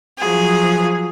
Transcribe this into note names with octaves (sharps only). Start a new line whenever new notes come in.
F3 F#3 G#4